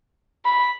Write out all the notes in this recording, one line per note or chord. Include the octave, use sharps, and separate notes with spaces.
B5